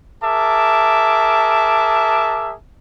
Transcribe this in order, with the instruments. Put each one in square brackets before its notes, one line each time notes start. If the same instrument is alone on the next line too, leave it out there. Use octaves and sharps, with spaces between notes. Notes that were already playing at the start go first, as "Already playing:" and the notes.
[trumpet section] G#4 A#4 E5 A5 D6